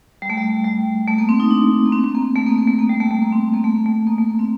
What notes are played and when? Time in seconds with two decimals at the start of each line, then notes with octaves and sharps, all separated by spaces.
0.22 G3
0.30 A3
0.37 G3
0.65 G3
1.07 A3
1.18 A#3
1.29 C4
1.40 D#4
1.51 D4
1.85 A#3
1.93 C4
2.04 C4
2.15 A#3
2.35 A3
2.46 A#3
2.58 A#3
2.68 A3
2.79 A#3
2.90 G3
3.00 A3
3.11 A3
3.22 A#3
3.32 C4
3.49 C4
3.54 A#3
3.64 A3
3.86 A3
4.07 A#3
4.18 A3
4.29 A#3
4.39 C4